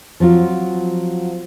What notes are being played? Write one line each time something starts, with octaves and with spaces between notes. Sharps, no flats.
F3 F#3 C4 F4